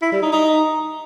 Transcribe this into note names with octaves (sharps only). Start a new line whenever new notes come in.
E4
G3
D#4
D#4